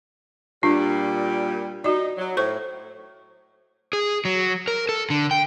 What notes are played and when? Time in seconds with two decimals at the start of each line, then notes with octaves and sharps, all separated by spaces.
0.63 A#2 G3 D4 F4
1.84 D#4 F#4 D5
2.18 F#3
2.37 A2 C5 C#6
3.93 G#4
4.25 F#3
4.68 A#4
4.89 A4
5.10 D3
5.31 G5